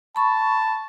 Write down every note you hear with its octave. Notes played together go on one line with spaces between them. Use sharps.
A5 B5 C#6